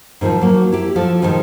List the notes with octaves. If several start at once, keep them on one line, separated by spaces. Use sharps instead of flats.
G#2 D3 D#3 F3
F#3 A#3
E4 G4
F3 F4 A4
G#2 D#3 E3 G3 G#3